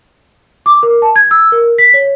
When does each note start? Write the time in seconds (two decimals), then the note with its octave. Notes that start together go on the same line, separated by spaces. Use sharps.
0.66 D6
0.83 A#4
1.02 A5
1.16 G#6
1.31 E6
1.52 A#4
1.78 B6
1.94 C#5